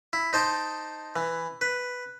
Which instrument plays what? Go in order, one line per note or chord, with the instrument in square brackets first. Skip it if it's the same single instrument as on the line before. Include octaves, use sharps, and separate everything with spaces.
[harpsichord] E4
D#4 C5 A5 D6
E3
B4